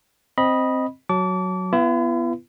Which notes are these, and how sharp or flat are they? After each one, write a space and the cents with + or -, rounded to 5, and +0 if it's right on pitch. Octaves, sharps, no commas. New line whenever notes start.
C4 +0 D#5 +0 B5 -15
F#3 +0 A5 +0 D6 -30
B3 +0 E4 +45 B4 +0